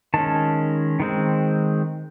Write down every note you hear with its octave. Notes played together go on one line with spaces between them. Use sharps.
D#3 G#3 C#4 A5
D#3 G#3 C4